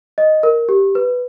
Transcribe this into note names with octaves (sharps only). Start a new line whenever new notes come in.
D#5
A#4
G4
B4